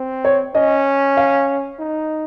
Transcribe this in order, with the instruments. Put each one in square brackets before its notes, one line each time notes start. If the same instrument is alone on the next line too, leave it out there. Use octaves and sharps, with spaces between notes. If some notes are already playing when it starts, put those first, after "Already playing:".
Already playing: [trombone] C4
[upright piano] C#5
[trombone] C#4 [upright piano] D#5
[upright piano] F5
[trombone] D#4